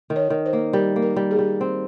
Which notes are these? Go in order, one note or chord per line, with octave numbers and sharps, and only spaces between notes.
D#3
C#5
D#3
C5
A#3
G3 A#4
A#3
A#4
G3
G#4
G3
C4